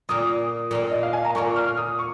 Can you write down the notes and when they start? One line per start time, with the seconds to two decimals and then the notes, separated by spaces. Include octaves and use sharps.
0.09 A#2 A#3 F4 D#6
0.71 A#2 A#3 F4
0.91 D#5
1.03 F5
1.13 G#5
1.25 A#5
1.35 A#2 A#3 F4 C#6
1.56 F6
1.77 D#6
1.99 C#6